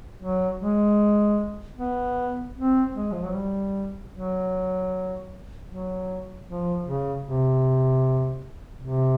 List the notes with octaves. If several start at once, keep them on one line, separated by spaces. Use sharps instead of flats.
F#3
G#3
B3
C4
G#3
F3
F#3
G3
F#3
F#3
F3
C#3
C3
C3